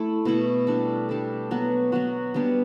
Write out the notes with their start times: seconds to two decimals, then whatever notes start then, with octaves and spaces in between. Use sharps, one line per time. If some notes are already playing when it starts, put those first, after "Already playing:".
Already playing: A3 E4
0.25 B2 A3 E4
0.67 G3 D4 A4
1.09 G3 D4 A4
1.51 F#3 B3 F#4
1.92 F#3 B3 F#4
2.34 G3 B3 D4